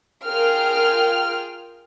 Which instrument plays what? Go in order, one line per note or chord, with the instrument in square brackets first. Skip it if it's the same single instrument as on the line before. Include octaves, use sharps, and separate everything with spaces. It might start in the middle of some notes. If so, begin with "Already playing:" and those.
[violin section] F4 G#4 A#4 G5 F6